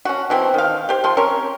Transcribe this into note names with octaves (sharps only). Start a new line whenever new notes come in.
C#4 F#4
B2 E3 C4
D#3 F5
G4 C5
F3 F4 C6
C4 C#4 A#4 C#5